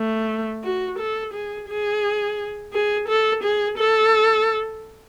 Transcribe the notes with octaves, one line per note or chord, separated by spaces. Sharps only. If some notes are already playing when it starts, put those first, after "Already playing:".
Already playing: A3
F#4
A4
G#4
G#4
G#4
A4
G#4
A4